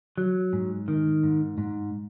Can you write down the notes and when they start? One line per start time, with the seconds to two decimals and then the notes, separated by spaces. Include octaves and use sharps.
0.18 F#3
0.53 G#2
0.88 D#3
1.23 G#2
1.58 G#2